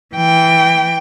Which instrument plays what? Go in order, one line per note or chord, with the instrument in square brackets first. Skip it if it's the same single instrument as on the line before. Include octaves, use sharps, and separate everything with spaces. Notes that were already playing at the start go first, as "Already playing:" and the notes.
[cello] E3 G5